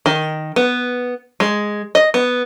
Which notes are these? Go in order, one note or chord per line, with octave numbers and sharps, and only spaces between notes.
D#3
B3
G#3
D#5
B3